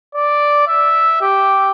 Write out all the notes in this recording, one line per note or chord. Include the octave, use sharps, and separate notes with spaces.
D5
E5
G4